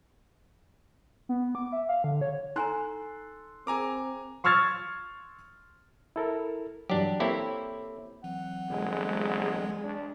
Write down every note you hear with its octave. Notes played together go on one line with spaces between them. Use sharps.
B3
D6
E5
F5
D3
C#5
D#4 A4 G#5 A#5 C6 F#6
C4 G#4 A#4 G#5 A#5 D6
C6 C#6 E6 F6 G#6 A6
E4 A4 A#4
G2 E3 F#3 D4 G4
A#3 C4 E4 G4 A4 C#5
E3 F#3 C4 F#5
G1 G#3
D4